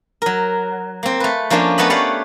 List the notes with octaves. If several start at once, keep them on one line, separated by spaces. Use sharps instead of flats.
F#3 A#4
A#3 C4
A3 B4
F3 A#3 C#4 D4 F4
A3 B3 B4 D#5 B5
G4 B4 C#5 D5 F5 F#5